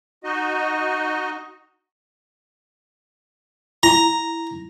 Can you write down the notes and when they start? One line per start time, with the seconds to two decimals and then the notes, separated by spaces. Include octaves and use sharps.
0.24 D#4 F#4 D#5
3.83 E4 A#5